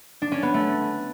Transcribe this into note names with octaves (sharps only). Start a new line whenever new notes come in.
D4
C#4
B3
A3